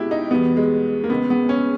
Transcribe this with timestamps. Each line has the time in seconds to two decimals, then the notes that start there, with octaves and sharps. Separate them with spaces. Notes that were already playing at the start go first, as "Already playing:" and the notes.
Already playing: C#2 B2 G#3 E4 G4
0.11 D#4
0.30 E2 B2 G3 B3
0.57 G#3
1.04 A#3
1.10 C#2 C#3 G#3 B3
1.30 B3
1.49 C#4